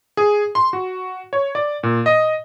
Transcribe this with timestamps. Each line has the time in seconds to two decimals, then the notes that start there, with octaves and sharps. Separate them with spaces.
0.17 G#4
0.55 C6
0.73 F#4
1.33 C#5
1.55 D5
1.83 A#2
2.06 D#5